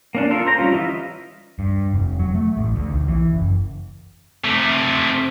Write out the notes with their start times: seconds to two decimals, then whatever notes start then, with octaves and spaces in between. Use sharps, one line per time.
0.15 A#3 C#4 D4
0.31 F4 A4 A#4
0.47 C5 A#5
0.59 G3 C#4 F4
0.72 E3 F4 D#5 E5
1.59 G2
1.94 F1
2.19 F#3
2.35 A3
2.57 A1
2.76 D2
2.89 B1
3.08 E3
3.34 F#1
4.45 C3 A3